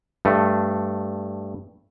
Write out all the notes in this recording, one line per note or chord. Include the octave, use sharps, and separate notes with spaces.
G2 A3